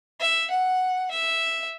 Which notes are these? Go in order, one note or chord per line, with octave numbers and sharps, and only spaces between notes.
E5
F#5
E5